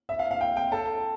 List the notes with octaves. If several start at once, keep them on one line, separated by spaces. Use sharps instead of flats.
E5
F5
F5
G5
G5
A4